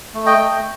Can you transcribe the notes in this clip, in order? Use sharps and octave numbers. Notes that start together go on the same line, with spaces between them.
A3
D#5 G5
A3